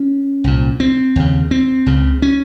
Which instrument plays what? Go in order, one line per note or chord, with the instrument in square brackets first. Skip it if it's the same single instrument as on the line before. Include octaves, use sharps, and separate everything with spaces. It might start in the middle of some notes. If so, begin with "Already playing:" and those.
Already playing: [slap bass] C#4
C2 A#2
C4
D#2 C#3
C4
C#2 C#3
C#4